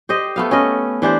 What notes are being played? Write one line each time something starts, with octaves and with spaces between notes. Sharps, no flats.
G4 C5 D#5
A3 B3 F5
C#4 B4 D#5
E3 D4 G4 C5